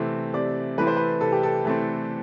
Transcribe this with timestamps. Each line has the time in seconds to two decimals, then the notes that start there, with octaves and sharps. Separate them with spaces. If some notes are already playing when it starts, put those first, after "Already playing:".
Already playing: C3 E3 A3 C4 E5
0.34 C3 D5
0.78 E3 A3 C4 B4
0.87 C5
0.97 B4
1.21 C3 A4
1.32 G4
1.43 A4
1.65 E3 A3 C4